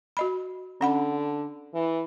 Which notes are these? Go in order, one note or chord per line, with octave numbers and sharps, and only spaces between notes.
F#4 D#5 B5
D3 C#4 F#5 B5
E3